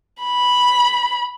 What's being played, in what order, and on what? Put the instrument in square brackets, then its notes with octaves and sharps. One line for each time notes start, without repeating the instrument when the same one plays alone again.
[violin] B5